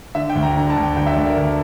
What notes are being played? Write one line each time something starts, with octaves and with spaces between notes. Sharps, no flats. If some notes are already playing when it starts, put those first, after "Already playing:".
D3 E5
G5
D2
A#5
D3 A#5
A5
D2
G5
D2 G5
E5
D2 D5
A#4
D2